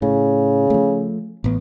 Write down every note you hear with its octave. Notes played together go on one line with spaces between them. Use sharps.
A2 C#3
F3 A3
A1 A2 B3